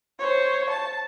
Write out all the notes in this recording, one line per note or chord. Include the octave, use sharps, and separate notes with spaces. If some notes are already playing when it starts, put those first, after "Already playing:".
C5 C#5
A5